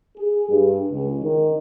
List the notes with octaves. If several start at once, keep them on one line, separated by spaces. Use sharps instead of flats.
G#4
G2
C#2
D#3